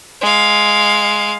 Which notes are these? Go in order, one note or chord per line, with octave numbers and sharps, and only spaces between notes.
G#3 F5